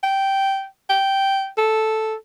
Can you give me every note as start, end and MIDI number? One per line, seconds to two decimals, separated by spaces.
0.03 0.66 79
0.89 1.48 79
1.57 2.15 69